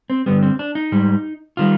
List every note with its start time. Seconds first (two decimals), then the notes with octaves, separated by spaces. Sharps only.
0.10 C4
0.26 G2 D3 G3 B3
0.43 C4
0.59 D4
0.75 D#4
0.92 G#2 G3
1.57 D#3 G3 F4